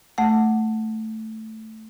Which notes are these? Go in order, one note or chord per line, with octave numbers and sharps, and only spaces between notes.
A3 F#5